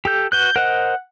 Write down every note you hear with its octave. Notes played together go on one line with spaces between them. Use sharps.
G4 A4 G6
F#4 B4 F#6 G6
A#4 C5 D#5 F#5